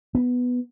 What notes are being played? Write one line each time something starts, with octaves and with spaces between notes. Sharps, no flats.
B3